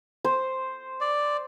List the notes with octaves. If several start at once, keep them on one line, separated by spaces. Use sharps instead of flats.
C5
D5